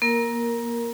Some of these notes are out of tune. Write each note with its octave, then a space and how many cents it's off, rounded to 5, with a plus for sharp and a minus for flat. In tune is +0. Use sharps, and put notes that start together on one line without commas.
A#3 +20 A#4 +0